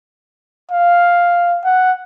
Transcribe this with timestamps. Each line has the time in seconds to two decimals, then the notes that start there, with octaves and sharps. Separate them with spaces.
0.71 F5
1.64 F#5